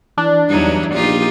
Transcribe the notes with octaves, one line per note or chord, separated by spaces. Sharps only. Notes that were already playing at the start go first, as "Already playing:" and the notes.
E3 D4
E2 G2 F#3 D#4
A#1 D#4 F4 G4